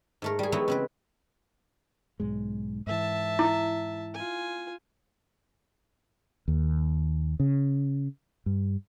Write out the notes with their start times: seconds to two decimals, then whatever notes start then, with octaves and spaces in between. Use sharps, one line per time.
0.22 G#2 A3 A#4
0.39 G3 G#4
0.52 E3 F#3 G#3 B3 D#4 E4
0.68 C#3 C4 B4
2.20 B1 G#2 G#3
2.87 G#2 E3 E5 A5
3.39 E4
4.14 F4 G#5
6.48 D#2
7.40 C#3
8.46 G2